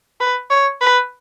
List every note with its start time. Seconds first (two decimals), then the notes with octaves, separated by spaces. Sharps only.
0.21 B4
0.51 C#5
0.81 B4